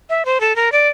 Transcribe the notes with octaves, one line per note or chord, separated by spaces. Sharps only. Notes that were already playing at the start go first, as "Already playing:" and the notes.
E5
C5
A4
A#4
D5